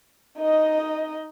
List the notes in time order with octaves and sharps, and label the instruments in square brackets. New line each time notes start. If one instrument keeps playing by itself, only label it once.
[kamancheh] D#4 D#5